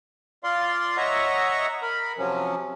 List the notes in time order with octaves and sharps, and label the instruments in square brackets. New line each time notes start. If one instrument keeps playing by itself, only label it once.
[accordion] F4 D5 F5 C6
C#5 D#5 E5 F#5 A#5 C#6
A#4 B5
C3 F3 F#3 C#4